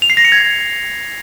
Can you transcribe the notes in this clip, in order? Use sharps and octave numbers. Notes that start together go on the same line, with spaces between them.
F7
C7
A#6
C#7
G#6